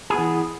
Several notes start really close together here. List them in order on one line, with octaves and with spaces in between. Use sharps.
G#4 B3 E3